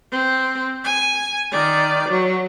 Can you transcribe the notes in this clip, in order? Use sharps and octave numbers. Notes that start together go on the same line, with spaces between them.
C4
G#5
D#3 D5
F#3